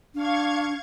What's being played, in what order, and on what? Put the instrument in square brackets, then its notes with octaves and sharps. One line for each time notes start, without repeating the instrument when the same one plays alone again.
[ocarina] D4 [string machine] F5 C#6 G#6